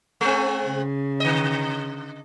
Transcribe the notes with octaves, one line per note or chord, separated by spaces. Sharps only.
G#3 C4
C#3
D3 D#5